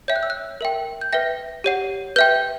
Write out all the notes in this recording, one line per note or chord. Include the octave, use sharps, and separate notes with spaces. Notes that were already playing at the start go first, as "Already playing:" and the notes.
C#5 E5 G5 G6
F#6
E6
F#6
A#4 E5 G5
G6
B4 E5 G5 A#6
G4 C#5 F#5
B4 E5 G5 G6